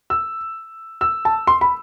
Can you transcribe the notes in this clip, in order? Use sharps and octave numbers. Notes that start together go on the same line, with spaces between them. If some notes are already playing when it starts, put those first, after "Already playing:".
E6
E6
A5
C6
B5